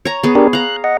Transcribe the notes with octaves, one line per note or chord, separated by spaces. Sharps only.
C#5 A#5
B3 G#4
D4 G4 A#4
F5 A#5 F#6
D#5 F#5